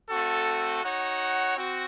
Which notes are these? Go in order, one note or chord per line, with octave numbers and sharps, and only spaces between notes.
A3 C4 F#4 A4
D#4 F#4 C#5 F#5
C4 F#4